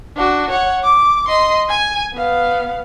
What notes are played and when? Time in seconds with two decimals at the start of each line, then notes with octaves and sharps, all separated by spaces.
0.16 D4 F#4
0.51 C#5 F#5
0.83 D6
1.28 D#5 C6
1.69 G#5
2.15 B3 F5